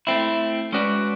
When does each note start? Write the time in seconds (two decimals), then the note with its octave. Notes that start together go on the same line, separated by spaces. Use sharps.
0.07 A3 C4 E4
0.72 G#3 C#4 F#4 B4 D5